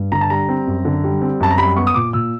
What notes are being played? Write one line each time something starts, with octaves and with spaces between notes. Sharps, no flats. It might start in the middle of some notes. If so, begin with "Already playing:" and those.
Already playing: G2
D3 A#5
A5
G3 A#5
C4
F#2
D3
G3
C4
F#2 A5
A#5
G3 B5
B3 C#6
D#6
A#2 D6
A#2 E6